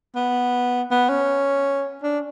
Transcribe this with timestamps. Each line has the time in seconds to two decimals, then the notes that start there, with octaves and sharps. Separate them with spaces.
0.15 B3
0.91 B3
1.09 C#4
2.03 D4